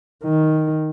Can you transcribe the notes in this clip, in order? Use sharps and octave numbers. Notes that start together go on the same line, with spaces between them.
D#3